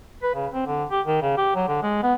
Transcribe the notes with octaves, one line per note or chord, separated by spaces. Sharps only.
B4
C#3
C4
D3
G4
D#3
C#3
G4
F#3
D3
G#3
B3